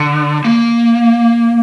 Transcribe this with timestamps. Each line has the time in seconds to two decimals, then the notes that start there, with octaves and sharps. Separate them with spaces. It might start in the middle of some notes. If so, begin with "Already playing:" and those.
Already playing: D3
0.45 A#3